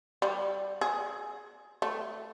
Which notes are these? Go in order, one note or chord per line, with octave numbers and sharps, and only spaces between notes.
G3
G#4
A3